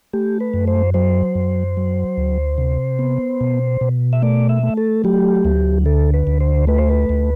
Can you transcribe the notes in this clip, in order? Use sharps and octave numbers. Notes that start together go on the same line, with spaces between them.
A3 G4
B4
F#2
C5
F#3 C5
F#2
F#3
D2
C3
B3
B2
B2
E5
A3 D5
E5
A3
A4
F#3 G4
D2
D3 A4
B4
D2
C5
A3 B4
C5
B4
D2